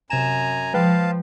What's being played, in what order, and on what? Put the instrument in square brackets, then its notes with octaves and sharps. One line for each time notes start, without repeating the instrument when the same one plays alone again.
[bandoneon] F#2 G#5 A#5 [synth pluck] C3 E7
[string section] F3 [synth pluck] G#3 B4 G5 [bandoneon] F5 A5